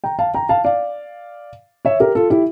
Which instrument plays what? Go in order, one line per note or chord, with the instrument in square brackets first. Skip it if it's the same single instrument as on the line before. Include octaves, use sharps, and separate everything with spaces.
[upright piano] G5 A#5
F5 A5
G5 A#5
F5 A5
D5 F5
C#5 E5
G4 A#4
F4 A4
E4 G4